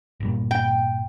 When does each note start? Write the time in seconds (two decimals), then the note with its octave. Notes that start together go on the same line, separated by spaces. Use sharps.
0.20 G1 A#2 G3
0.51 G5